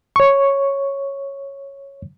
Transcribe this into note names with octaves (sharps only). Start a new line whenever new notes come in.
C#5 C#6